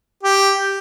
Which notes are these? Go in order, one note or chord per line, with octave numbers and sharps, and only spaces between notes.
G4